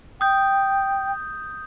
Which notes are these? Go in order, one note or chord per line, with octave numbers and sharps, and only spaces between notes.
G5 D#6 G6